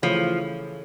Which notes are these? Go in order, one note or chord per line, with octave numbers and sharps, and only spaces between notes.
C#3 E3 F3 A3 C#4